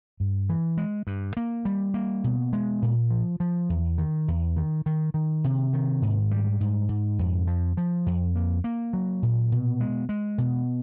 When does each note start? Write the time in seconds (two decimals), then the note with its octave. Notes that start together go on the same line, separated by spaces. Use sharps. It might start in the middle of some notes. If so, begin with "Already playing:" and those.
0.20 G2
0.49 E3
0.77 G#3
1.07 G2
1.37 A#3
1.65 G3
1.94 A#3
2.24 B2
2.53 G#3
2.82 A#2
3.11 F3
3.40 F3
3.69 E2
3.98 D#3
4.28 E2
4.56 D#3
4.86 D#3
5.14 D#3
5.44 C3
5.73 D#3
6.02 G#2
6.31 G3
6.61 G#2
6.89 G#2
7.19 F2
7.47 F3
7.77 F3
8.06 F2
8.36 A#3
8.64 A#3
8.93 F#3
9.23 A#2
9.52 B2
9.80 G#3
10.09 G#3
10.38 B2